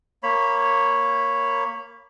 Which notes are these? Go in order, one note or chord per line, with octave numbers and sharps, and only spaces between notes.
A#3 C#5 B5